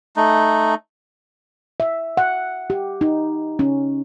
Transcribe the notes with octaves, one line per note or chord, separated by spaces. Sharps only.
A3 D#4
E5
F#5
G4
D#4
C#4